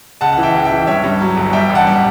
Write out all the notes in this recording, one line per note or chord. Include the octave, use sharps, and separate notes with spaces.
C#2 F#5 A5
E3 F#5
E5 G5
C#2
E5 G5
E3
G2 C#5 E5
G2
F#3
G1
G3 E5 G5
A1
F#5 A5
G3